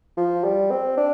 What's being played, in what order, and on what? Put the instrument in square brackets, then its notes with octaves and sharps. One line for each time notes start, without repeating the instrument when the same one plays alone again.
[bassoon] F3
G3
C4
D4